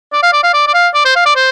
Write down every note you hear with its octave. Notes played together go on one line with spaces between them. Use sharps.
D5
F5
D5
F5
D5
D5
F5
D5
C5
F5
D5
C5